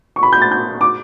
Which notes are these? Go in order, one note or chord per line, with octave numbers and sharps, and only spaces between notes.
C#6
B5
G6
A6
G6
D6